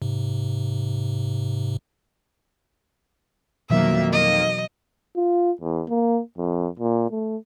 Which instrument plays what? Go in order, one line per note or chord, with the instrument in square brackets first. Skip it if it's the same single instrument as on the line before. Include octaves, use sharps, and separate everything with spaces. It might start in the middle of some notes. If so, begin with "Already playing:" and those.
[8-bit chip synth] G#2 C3
[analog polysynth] F2 D#3 A#3 [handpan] B2 E3 F#3 [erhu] E5
[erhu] D#5
[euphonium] F4
E2
A#3
F2
A#2
A3